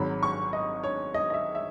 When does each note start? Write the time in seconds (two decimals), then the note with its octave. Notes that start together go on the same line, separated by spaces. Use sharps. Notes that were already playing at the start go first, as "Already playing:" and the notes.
Already playing: G#1 G#2 F#3 B5
0.23 C#6
0.53 D#5
0.84 C#5
1.14 D#5
1.30 D#5
1.34 E5
1.55 E5